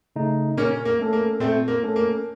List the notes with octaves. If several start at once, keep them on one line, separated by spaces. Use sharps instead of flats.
C#3 A3 D#4
A#2 A#3 C#4
A#3
A3 C#4 A4
A#3
A#2 A3 C4
A#3
A3 C#4 A4
A#3